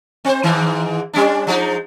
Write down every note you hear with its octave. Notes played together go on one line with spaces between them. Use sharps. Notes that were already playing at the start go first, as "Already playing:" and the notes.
C4 C5
G#2 D#3 E3
G3 C#4 D4
F3 G#3 D#4